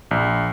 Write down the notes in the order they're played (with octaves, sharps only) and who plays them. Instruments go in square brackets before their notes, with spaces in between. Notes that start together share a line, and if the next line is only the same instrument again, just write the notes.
[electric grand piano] A#1